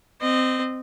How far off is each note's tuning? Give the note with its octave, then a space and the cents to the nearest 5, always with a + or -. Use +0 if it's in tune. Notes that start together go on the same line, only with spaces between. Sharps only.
C4 -20 D#5 -20